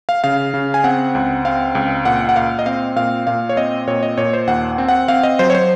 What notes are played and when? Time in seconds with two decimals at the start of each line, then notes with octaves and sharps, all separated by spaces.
0.09 F5
0.24 C#3 F5
0.54 C#3
0.74 G#5
0.84 C4 F#5
1.15 C#2
1.45 C4 F5
1.75 C#2
2.05 A#2 F#5
2.29 F#5
2.36 A#2 F5
2.59 D#5
2.66 C4 F5
2.96 A#2 F5
3.27 A#2 F5
3.49 C#5
3.57 C4 D#5
3.87 A#2 C#5
4.03 D#5
4.17 A#2 C#5
4.33 C5
4.47 D#2 F#5
4.78 C4
4.88 F#5
5.08 C4 F5
5.23 D#5
5.39 F#3 C5
5.50 C#5
5.55 C5